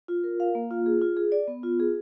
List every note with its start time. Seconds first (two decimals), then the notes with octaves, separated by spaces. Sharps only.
0.08 F4
0.24 A#4
0.40 F5
0.55 A#3
0.71 F4
0.86 G#4
1.01 F4
1.17 G#4
1.32 D5
1.48 B3
1.63 F4
1.80 G#4